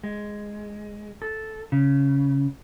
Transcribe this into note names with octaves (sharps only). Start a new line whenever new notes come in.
G#3
A4
C#3